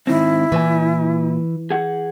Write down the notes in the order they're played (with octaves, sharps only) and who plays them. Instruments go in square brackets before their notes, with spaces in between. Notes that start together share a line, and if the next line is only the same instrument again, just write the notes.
[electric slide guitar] G#2 D#3 C4 [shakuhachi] E4
[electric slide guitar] A#2 C5 G#5 [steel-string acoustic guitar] E3
[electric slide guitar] G#4 F#5